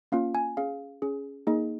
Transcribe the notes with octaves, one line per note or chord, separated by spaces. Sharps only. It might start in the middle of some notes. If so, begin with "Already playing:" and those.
A#3 C#4 F4 F5
G#5
C#4 G#4 F5
C#4 G#4
A#3 D#4 G#4 D#5